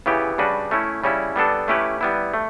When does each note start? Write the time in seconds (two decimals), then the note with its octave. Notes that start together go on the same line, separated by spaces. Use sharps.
0.06 C#3 E3 B3 E4 G4
0.38 C#3 G3 D4 F#4 B4
0.71 A3 C#4 E4
1.04 C#3 G3 C#4 E4
1.36 G3 B3 D4 A4
1.68 A3 C#4 E4 G4 B4
2.01 G3 B3 E4
2.34 A3